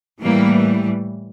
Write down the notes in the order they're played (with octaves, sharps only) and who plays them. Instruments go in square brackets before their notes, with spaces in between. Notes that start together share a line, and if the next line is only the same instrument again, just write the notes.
[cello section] A2 E3 G3 A#3